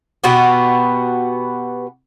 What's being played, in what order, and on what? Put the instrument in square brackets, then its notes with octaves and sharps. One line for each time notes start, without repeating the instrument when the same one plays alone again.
[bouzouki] B2 B3 F#4 G4